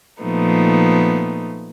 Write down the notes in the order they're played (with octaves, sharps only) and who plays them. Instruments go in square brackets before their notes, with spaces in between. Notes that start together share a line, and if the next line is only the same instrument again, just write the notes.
[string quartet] A#2 F3 A3 B3 D#4